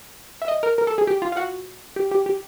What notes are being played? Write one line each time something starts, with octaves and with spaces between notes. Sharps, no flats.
E5
D#5
A#4
A#4
A4
G#4
G4
F4
F4
F#4
G4
G4
G4